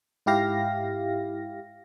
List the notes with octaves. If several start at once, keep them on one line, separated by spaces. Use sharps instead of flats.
G#2 E4 G4 F5 A#6